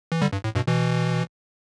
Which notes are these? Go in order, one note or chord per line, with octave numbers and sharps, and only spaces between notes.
E3
D3 G3
G2
A2
G2 B2
B2 E3